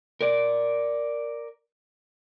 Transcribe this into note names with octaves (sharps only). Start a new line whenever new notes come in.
A#4 D5